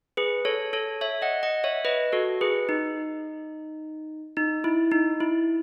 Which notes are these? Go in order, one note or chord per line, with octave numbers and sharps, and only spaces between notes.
G#4 B4
A4 C#5
A4 C#5
C#5 E5
D#5 F#5
D#5 F#5
C#5 E5
B4 D#5
F#4 A4
G#4 B4
D#4
D#4
E4
D#4
E4